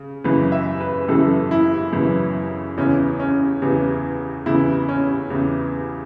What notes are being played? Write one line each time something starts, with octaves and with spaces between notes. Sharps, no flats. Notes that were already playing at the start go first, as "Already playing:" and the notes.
Already playing: C#3
F#2 C#3 E3 B4
E5
B4
F#2 C#3 E3 A4
E4
F#2 C#3 E3
E2 C#3 E3 C#4
C#4
E2 C#3 E3
E2 C#3 E3 E4
C#4
E2 C#3 E3